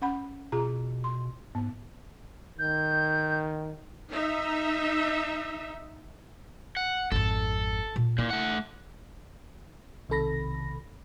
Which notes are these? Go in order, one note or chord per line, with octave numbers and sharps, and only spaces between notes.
C#4 F#5 B5
B2 F4 G#4 A#5
C6
G#2 B3
D#3 G6
D#4 E5
F#5
G#1 F2 A4
A#2
A#2 E4
A3 F#5
B1 C3 D#3 A4 B5 A#6